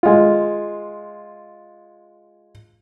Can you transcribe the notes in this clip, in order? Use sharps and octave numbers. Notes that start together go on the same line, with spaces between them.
G#3 F4